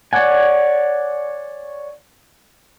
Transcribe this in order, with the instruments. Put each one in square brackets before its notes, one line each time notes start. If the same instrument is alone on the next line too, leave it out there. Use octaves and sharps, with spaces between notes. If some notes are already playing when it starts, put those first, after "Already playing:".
[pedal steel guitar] C#5 D5 F#5 G#5